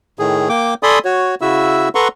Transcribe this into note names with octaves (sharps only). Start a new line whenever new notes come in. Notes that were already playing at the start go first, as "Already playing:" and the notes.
A2 D#3 G#4
A#3 G5 D6
A4 D5 G#5 B5 C6 D#6
F#4 C#5
C#3 E4 F#4 E5 E6
A4 B4 F#5 A#5 C6 C#6